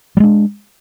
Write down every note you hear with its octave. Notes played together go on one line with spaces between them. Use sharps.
G3 G#3 D4